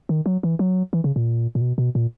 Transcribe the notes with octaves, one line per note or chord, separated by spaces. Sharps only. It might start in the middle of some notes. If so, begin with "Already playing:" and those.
D#3
F#3
E3
F#3
E3
C#3
A#2
A#2
B2
B2
A#2